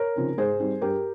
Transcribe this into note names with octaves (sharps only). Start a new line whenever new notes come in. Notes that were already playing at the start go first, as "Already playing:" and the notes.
Already playing: A#4 C#5
C#3 F3 C4 D#4
G#2 G#4 C5
G3 C4 D#4
G2 G4 A#4